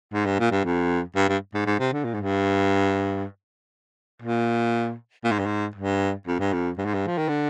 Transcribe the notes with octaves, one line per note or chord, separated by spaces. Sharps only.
G#2
G2
A#2
G2
F2
G2
G2
G#2
G#2
C3
D3
A#2
G#2
G2
A#2
A#2
G#2
G2
G#2
G2
F2
G2
F2
G2
G#2
G2
F3
D#3
D3